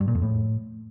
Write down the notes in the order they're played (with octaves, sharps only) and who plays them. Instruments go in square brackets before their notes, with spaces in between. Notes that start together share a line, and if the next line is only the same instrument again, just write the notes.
[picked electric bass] G2
A#2
F2
A2